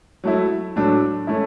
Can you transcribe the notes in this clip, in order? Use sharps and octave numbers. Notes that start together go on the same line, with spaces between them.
F#3 A3 E4
A2 F#3 A3 D4
A3 C#4 E4